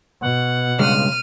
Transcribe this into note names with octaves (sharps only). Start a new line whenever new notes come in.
B2 F#5
C#2 G2 G#3 F6 D#7